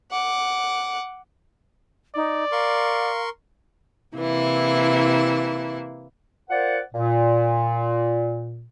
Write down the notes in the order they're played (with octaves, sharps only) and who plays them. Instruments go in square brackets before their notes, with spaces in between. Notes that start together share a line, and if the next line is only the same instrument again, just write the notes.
[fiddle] F#5 D6
[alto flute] D#4 [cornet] D5
[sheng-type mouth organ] A#4 C6 C#6 [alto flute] F5
[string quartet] C3 E3 A#3 E4
[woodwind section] F4 A#4 C5 D5 F#5
A#2